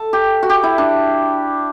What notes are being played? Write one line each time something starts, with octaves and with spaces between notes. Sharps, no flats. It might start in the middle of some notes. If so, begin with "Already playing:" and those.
Already playing: A4
G4
F#4
G4
E4
D4